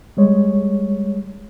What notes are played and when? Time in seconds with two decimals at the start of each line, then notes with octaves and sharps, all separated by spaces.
0.17 G3 G#3 C#5